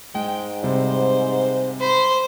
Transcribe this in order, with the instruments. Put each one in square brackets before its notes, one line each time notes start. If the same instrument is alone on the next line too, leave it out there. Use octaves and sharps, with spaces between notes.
[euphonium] G#2 [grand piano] G#3 [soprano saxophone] G5
[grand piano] C3 G3 [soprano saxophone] C5
[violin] C5 [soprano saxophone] B5